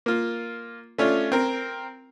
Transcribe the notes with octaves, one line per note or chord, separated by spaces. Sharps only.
A#3 F4
A3 C#4 D4 F4
C4 A#4